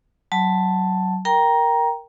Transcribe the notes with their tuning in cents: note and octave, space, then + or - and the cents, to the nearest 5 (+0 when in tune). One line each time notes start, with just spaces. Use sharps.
F#3 +20 A5 +0
A#4 +0 G5 +0 A#5 +15